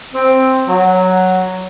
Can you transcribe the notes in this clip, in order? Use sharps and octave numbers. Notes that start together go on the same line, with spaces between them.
C4
F#3